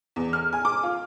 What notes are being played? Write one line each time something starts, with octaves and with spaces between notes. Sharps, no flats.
E2
F6
G#5
D6
F4